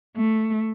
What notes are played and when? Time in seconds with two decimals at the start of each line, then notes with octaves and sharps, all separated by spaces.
0.16 A3